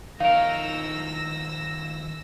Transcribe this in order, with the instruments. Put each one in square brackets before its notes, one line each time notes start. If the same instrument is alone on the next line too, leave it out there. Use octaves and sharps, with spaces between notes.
[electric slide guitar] D#3 F3 C#5 [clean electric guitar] D#4 A#4 [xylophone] F5 [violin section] E6 A#6